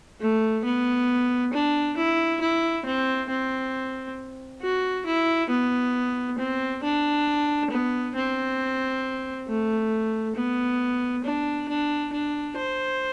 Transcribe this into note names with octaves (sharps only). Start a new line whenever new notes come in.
A3
B3
D4
E4
E4
C4
C4
F#4
E4
B3
C4
D4
B3
C4
A3
B3
D4
D4
D4
C5